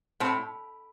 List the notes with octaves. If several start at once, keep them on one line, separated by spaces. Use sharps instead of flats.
A2 C4